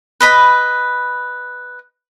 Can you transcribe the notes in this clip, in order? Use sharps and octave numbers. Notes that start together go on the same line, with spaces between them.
B4 D#5 B5